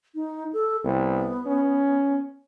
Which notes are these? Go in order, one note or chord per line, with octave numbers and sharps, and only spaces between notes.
D#4
A4
C2 B3
C#4